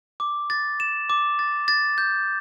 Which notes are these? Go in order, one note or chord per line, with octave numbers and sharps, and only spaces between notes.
D6
A6
E7
D6
A6
A6
G6